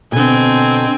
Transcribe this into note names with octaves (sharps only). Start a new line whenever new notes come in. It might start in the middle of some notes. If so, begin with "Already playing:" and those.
B2 D3 C4 G#5